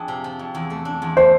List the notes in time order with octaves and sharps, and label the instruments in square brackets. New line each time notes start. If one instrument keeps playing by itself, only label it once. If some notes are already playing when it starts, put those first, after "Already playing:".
Already playing: [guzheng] F2 D4 G#4
C3
F3
F2
E2
A3
D4
E2
[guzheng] A3 [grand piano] C5